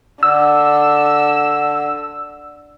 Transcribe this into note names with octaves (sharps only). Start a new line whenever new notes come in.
D3 E6